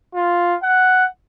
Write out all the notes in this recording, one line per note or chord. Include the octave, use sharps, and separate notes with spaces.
F4
F#5